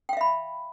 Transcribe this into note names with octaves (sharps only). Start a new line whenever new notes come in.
E5 F5 G5 B5